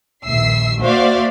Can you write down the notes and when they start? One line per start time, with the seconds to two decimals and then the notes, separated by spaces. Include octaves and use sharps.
0.24 A#1 D#2 E5 E6 C7
0.80 A#3 F#4 C5 D5 E5 F5